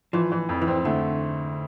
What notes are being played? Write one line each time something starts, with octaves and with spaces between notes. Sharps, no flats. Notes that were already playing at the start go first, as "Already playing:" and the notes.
E3 F3
E3
F2
E3
C4
D3 A3